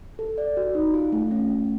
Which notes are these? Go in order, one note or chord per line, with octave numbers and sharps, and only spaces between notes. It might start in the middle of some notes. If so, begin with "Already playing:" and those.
A4
D5
F#4
D#4
F4
A3
C#4
A3